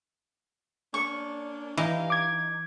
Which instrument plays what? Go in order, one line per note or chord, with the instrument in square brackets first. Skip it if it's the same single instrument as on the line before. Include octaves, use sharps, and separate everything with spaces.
[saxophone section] A#3 C#4 D4 [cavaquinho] C#6
[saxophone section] G2 F5 [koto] E3 [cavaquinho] D#4
[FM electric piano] D6 G#6